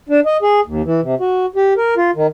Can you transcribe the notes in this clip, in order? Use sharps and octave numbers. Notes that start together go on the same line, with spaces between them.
D4
D#5
G#4
D#2
E3
C3
F#4
G4
A#4
F4
D#3